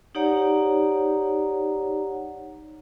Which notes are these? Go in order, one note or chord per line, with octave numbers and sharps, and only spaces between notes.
D#4 G4 C#5 D5 F#5 A#5